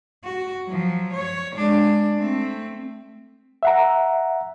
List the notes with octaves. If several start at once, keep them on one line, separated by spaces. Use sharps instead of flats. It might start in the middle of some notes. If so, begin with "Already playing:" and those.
F#4
F3 F#3
C#5
G#3 D4
A3 C4
E5 F#5 A#5